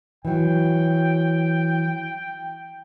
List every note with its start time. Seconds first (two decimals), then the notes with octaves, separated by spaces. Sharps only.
0.25 E3 F#3 G5